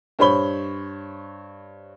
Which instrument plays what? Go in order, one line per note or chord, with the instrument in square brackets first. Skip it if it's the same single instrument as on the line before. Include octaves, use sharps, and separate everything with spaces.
[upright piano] G2 C5 C#5 B5 G7